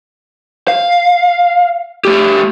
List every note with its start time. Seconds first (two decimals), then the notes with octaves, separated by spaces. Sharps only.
0.68 F5
2.05 A3 G4